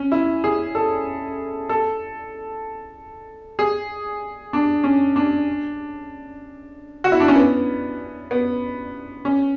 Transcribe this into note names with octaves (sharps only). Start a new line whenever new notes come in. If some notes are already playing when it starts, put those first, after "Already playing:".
Already playing: C#4
E4
G#4
A4
A4
G#4
D4
C#4
D4
F#4
E4
D4
C#4
B3
B3
C#4